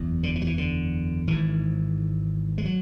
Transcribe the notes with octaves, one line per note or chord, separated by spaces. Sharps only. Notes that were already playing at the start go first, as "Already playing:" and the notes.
Already playing: F#1 E2
D3
E3
F#3
E3
D3
G#1 G#2 E3
G#3
F#3